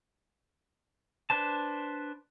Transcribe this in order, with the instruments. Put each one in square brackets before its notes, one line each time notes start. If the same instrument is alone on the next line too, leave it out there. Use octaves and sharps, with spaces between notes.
[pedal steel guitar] D4 B4 C5 A5